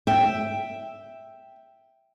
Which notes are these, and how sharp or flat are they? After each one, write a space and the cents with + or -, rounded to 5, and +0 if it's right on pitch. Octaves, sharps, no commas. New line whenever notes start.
E5 +0 G5 +0